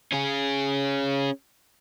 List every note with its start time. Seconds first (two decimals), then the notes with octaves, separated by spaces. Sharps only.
0.13 C#4 G#4